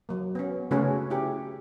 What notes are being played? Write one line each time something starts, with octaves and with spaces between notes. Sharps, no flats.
F#3 A#3
B3 C#4
C#3 A3 C#4 F#4 G#4 B4
E4 G4 G#4